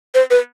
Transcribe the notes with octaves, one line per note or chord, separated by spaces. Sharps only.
C5
B4